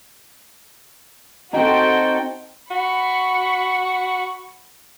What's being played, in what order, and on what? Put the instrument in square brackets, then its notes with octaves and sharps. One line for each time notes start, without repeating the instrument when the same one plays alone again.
[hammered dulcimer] C4 D#4 [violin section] F#4 A4 G5
[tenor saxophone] F#4 [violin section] B5 C#6